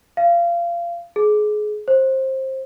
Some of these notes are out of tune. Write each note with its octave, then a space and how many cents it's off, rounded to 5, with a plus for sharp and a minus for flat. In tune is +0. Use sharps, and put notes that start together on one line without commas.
F5 -25
G#4 +25
C5 +20